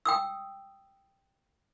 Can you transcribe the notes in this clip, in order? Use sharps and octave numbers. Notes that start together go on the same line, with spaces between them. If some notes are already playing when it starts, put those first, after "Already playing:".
G5 D#6 E6